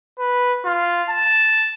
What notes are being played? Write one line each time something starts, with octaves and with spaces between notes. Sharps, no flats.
B4
F4
A5